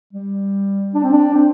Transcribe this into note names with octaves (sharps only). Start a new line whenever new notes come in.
G3
D4
C4
D4
C4